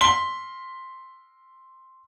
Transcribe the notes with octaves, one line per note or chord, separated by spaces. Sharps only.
C6 B6 G7